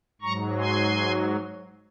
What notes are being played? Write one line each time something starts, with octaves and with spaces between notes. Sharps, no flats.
G#2 F#3 A#5 C#6
G#5 C6